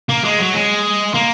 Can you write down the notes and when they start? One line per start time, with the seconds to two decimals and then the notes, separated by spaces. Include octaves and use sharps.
0.09 A#3
0.24 G#3
0.39 F#3
0.54 G#3
1.14 A#3